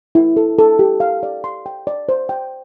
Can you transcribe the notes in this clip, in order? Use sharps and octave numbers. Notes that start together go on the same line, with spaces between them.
E4
A4
A4
G4
F5
D5
C6
G5
D5
C5
G5